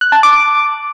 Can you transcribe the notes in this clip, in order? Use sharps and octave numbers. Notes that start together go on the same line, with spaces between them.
F#6
A5
D6